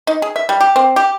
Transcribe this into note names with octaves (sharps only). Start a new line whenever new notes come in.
D#4
G#4
E5
G3
G4
C4
G4